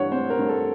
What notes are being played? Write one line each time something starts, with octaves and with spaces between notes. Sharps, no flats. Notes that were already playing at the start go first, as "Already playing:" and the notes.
Already playing: G2 E3 C#5 F#5
C4 C5
A#4
G2
A4